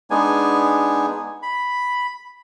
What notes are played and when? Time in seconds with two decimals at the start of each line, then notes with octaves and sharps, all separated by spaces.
0.11 G#3 B3 D4 D#4 G#5
1.42 B5